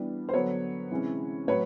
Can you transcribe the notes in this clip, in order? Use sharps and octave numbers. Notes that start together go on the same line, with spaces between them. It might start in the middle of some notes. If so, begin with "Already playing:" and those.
Already playing: E3 G3 B3 D4
C5
D3 F#3 B3 B4 C#5
C3 E3 G#3 C#4
A2 F#3 B4 C#5